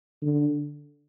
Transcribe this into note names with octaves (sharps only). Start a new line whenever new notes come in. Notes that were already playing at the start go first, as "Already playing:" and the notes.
D3